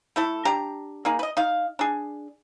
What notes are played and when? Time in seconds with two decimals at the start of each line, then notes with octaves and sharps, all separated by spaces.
0.16 A3 E4 A4
0.45 D4 G4 A#5
1.05 A#3 D#4 G#4
1.19 B4 D#5
1.37 D#4 F5
1.79 D4 G#4